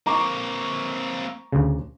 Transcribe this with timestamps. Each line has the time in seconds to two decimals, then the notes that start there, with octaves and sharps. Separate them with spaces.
0.07 A#3 C4 A#5 C#6 D6
1.52 D2 C#3